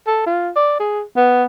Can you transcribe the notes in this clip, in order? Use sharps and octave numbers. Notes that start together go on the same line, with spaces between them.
A4
F4
D5
G#4
B3